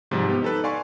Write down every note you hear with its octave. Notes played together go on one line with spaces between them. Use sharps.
G#2 C3 F3 G3
B3 G4
D#4 A4 B4
D5 F5 G#5 C6 C#6